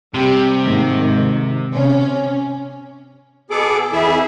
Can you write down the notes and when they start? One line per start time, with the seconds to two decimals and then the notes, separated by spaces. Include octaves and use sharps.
0.14 C3 G3 G4
0.63 G#2 D#3
1.75 C3 C#4
3.50 B2 B3 G#4 A4 D6
3.93 F2 E3 E4 G#4 E5